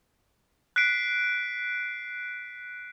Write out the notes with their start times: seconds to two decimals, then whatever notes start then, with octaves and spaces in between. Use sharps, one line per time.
0.76 F#6 B6 C7 D7